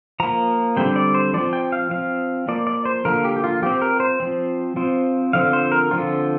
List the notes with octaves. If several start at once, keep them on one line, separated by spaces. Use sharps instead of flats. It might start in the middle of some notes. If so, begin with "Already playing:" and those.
F3 A#3 A#5
D3 G3 C4 G5
D5
C5
F3 C4 D5
G5
F5
F3 C4 F5
F3 A#3 D5
D5
C5
D3 F3 A#3 A#4
G4
G4
F4
F3 C4 G4
A#4
C5
F3 C4
F3 C4
D3 F3 C4 F5
C5
A#4
D3 F3 C4 F4